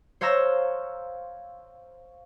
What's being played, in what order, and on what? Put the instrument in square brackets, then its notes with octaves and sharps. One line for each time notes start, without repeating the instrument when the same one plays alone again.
[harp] C5 C#5 F5 A#5 E6 A#6